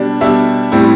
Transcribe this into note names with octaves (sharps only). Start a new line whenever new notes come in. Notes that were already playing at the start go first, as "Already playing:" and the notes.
Already playing: B2 G3 D4
B2 G3 D4 E5
A2 G3 C4 E4